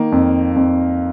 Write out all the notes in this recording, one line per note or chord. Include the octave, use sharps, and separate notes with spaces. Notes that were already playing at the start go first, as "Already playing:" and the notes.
Already playing: D#3 A#3
F2
F2